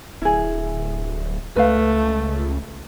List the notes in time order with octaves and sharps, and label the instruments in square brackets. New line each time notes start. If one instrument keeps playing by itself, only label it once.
[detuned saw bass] D1 [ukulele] E4 G#4
[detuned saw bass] C#2 [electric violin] A3 [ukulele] B4 F5